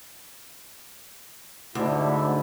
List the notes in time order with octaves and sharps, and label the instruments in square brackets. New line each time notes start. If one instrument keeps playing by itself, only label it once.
[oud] D2 [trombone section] G#2 D3 E4